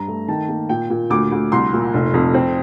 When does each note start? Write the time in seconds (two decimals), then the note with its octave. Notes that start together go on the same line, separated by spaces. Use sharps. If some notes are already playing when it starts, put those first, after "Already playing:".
Already playing: G2 A#5
0.08 A3
0.28 D#3 A5
0.48 A#3
0.69 A#2 G5
0.90 A#2
1.10 D2 D6
1.32 D2
1.52 C2 C6
1.73 A#2
1.94 F1
2.14 F2
2.34 C4